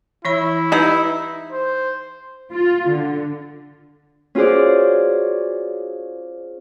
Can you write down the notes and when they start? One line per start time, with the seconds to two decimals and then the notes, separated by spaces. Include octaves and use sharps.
0.25 E3 E4 C#5 B5
0.72 D#4 G4 B4 D#5 B5
1.52 C5
2.50 F4
2.88 D3
4.35 C#4 F4 F#4 G#4 C5 D5